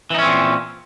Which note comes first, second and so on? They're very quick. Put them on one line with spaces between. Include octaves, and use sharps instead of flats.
E3 D#4 C#4 C4 A#2